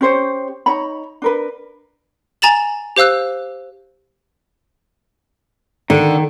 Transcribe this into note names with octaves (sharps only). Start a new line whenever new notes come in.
C#4 G4 C5 C#5
D#4 C#5 A#5 B5
D4 A#4 B4
G#5 A#5 A6 E7 F#7
G4 C5 F5 E6 F#6
D3 D#3